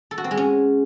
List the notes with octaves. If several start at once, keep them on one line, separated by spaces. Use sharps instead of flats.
A4
F#4
C4
G#3
C#4